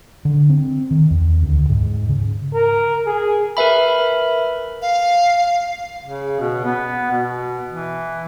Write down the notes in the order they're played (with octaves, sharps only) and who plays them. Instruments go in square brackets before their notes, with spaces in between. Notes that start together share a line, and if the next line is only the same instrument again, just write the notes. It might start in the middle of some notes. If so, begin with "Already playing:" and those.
[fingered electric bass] D3
C4
D#3
E2
D2
G#2
C#3
[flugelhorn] A#4
G#4
[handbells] A#4 B4 E5 B5
[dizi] F5
[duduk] C#3
B2
B3
B2
E3